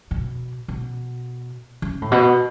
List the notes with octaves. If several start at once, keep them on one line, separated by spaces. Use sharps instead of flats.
B2
B2
C#3
A2
B2